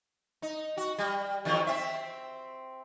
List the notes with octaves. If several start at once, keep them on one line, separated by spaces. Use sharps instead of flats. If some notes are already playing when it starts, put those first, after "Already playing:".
D#4
F#4
G3
E2 D#3 F#3
C4 E5